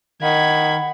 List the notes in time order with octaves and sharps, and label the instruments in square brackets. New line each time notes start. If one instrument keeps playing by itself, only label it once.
[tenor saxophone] D#3 [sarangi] F#5 [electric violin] B5 G#6